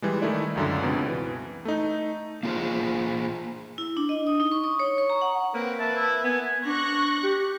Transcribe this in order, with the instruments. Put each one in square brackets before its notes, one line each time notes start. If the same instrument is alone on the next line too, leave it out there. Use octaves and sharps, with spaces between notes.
[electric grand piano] E3 G3 G#3
D#3 A3 D#4 E4 D5
C#2 F#2 D3
C#2 B2 C4
E3
A3 D#4
[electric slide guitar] A#3 F4 G#4 C5
[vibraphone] E4
D4
D#5
D#6
D#4
C#6
D#6
C#5
C#6
A#5
F#5
[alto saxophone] A#3 [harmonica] C4 A#4 B4
[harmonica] B4 E5 [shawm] A5
[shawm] E4
[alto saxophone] B3 [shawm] G#5
[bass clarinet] D4 [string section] C#6 F#6 A#6
[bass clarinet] G4